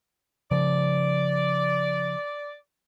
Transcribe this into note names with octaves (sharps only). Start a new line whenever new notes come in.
C#3 F3 D5